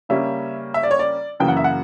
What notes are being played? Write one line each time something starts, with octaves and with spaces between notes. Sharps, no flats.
C#3 G3 A#3 C#4 E5
E5
D5
C#5
D5
F#2 C#3 E3 A#3 G5
F#5
E5
F#5